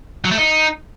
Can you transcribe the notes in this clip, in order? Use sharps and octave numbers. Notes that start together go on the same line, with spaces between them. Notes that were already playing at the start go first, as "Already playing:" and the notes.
F#3
A3
D#4